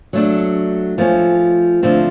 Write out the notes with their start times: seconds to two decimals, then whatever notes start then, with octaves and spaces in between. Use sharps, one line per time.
0.13 F#3 A3 D4
0.98 F3 A3 C#4
1.82 D3 F3 A3 C4